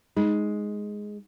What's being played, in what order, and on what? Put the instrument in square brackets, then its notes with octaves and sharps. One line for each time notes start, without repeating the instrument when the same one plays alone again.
[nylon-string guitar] G#3 [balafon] D#4